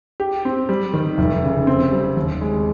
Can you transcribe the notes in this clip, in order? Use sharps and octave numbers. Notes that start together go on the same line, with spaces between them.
G4
C4
G3
D#3
F1
C#3
C4
G3
D#2
G#3